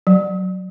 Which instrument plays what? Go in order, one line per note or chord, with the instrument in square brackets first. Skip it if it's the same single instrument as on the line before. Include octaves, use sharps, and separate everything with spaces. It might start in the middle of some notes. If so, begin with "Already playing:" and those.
[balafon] F#3